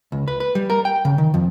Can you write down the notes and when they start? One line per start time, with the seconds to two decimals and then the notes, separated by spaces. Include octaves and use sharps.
0.12 C#2
0.28 B4
0.40 B4
0.55 G3
0.70 A#4
0.85 G5
1.05 C#3
1.18 D#3
1.34 F2